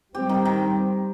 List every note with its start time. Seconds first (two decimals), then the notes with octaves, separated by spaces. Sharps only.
0.15 G3 C4 G4
0.29 D#3
0.45 D#3